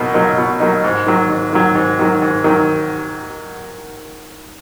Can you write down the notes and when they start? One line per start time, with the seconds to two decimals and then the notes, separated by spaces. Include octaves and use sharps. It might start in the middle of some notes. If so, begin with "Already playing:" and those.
Already playing: B2 F#3 A#3 D#4
0.14 F#3 A#3 D#4
0.38 B2
0.60 F#3 A#3 D#4
0.84 G#2
1.06 D#3 F#3
1.29 G#2
1.53 D#3 F#3
1.75 G#2
1.99 D#3 F#3
2.22 G#2
2.44 D#3 F#3